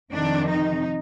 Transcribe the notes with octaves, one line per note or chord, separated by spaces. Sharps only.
F2 C3 D#3 D4
D#4